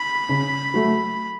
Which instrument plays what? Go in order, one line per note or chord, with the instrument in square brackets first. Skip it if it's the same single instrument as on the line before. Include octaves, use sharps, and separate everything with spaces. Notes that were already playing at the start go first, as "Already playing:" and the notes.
Already playing: [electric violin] B5
[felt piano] C#3
F#3 A3